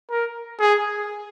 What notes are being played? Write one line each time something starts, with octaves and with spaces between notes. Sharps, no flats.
A#4
G#4